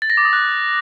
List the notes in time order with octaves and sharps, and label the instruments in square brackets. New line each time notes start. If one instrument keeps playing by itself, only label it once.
[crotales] A6
A#6
D6
D#6
F#6